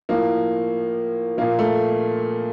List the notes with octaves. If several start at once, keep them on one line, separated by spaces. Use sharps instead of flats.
A2 F3 A#3
A#2 F3 A#3
A3